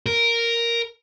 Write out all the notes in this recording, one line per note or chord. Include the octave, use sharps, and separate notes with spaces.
A#4